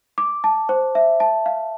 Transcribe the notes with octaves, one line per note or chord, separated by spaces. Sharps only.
D6
A5
C5
E5
A5
F5